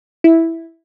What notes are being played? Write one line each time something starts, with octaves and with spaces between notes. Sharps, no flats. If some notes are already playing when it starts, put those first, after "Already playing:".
E4